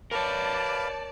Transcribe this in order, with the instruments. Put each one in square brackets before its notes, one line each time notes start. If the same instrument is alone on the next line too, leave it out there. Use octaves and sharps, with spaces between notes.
[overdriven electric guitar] A#4 C#5 [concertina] B4 F5 [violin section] D5 A5